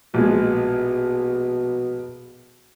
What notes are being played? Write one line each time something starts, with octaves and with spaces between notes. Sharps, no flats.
A#1 B2 G#3